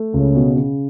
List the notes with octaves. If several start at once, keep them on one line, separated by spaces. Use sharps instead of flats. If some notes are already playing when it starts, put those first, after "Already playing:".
Already playing: A3
C#2 C#3
B2
C#3